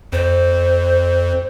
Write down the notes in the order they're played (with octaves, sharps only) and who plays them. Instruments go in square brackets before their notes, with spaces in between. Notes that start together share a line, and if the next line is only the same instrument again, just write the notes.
[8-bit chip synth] F2 [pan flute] C5